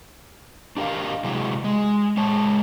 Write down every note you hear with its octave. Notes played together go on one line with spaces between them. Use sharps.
D4 G4 A#4 D#5 F5
C3 F#3 G#3 E4 F#4
G#3
G#3 C#5 A5